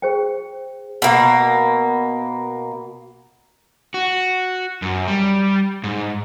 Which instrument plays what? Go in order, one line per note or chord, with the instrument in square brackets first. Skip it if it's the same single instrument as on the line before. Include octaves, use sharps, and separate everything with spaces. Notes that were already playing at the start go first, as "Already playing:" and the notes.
[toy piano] G#4 C5 G5
[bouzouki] B2 A#3
[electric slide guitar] F#4
F#2
G3
G#2